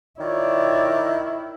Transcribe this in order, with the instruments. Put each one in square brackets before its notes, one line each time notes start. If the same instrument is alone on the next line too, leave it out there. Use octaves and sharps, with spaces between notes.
[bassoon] D#3 [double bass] E4 [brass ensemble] F4 C#5 D5